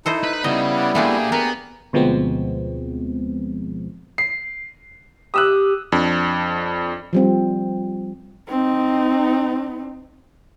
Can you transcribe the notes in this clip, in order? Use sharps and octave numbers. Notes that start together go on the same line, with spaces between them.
D#4 E4 A4 C5 D#5
B4 B5
C#3 G3 B3 E4 D#5
D5 F#5
A#2 A3 D4 F4 G4 G#4
B3 A#4 A#5
D2 B2 F3 G#3 B3 C4
C7
G4 D#6 E6 F#6
F2 D4
F3 G3 C4
C4 D#4